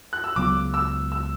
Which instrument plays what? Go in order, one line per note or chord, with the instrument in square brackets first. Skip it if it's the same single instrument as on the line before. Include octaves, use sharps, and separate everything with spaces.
[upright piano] F#6
E6
[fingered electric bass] C#2 C#3 F#3 B3 [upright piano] D6
[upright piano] E6
E6